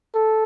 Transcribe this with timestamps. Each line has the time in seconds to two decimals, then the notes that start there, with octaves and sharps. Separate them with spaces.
0.15 A4